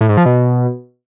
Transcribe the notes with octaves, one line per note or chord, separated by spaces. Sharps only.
A2
G#2
F3
B2